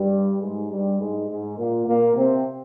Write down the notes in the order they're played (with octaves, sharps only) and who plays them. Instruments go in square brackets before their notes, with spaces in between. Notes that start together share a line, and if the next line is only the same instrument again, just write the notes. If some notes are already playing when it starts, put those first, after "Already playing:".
Already playing: [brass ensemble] G2 G3
G#2 G#3
G2 G3
G#2 G#3
G#2 G#3
A#2 A#3
A#2 A#3
C3 C4